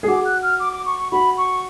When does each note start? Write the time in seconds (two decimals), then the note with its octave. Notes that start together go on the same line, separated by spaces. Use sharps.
0.03 G#4
0.08 F#4 D6
0.25 F#6
0.43 F6
0.60 D6
0.73 D6
0.86 C#6
0.99 C#6
1.12 F#4 B5
1.37 C#6